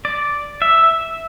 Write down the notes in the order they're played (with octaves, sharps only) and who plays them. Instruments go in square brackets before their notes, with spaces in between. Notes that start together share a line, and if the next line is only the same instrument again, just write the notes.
[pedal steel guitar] D5
E5